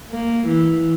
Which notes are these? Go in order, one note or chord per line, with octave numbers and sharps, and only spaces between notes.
A#3
E3